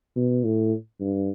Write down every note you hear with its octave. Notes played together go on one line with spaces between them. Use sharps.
B2
A2
G2